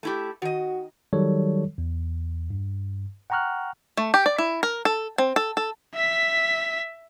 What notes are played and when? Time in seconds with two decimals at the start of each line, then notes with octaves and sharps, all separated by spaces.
0.03 A3 E4 G4
0.42 D#3 F#4 D#5
1.13 D#3 F#3 G3 A4 C#5
1.78 E2
2.50 G2
3.30 F#5 G5 A#5 C#6 F6 F#6
3.97 A3
4.14 G4
4.26 D5
4.38 E4
4.63 A#4
4.85 A4
5.18 C4
5.36 A4
5.57 A4
5.94 E5 B6